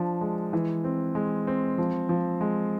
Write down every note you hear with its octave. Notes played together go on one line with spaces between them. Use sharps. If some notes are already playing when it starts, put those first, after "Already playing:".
Already playing: F3 D4
G#3
E3
C4
G#3
C4
F3
F3
G#3